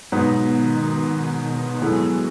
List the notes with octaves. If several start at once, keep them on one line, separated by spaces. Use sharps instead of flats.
G#2 B2 F#3 B3 D#4
D#3
A2 E3 F#3 G#3 B3